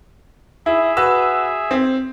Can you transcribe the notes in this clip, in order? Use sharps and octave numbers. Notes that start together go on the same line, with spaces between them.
E4 G#4 E5
F#4 B4 E6
C4